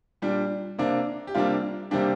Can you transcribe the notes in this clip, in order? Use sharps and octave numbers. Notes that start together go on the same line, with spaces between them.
A#2 G3 D4
C3 A#3 D4
G4
C3 G3 A#3 D4 F4
C3 G3 A#3 D4 G4